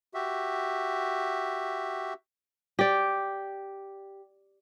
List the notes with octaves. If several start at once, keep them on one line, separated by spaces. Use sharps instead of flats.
F#4 G4 E5
G4 D5